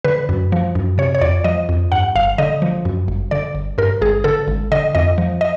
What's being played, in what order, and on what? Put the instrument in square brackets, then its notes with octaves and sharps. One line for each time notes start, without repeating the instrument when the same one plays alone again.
[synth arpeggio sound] D3 B4
F#2
F3
F#2
C3 C#5
C#5
F2 D5
F3 D#5
F2
G2 F#5
G1 F5
D3 D#5
F3
F#2
G1
D3 D5
G1
G2 A#4
G#1 G#4
D3 A4
G#1
D3 D#5
F2 D#5
F3
D#5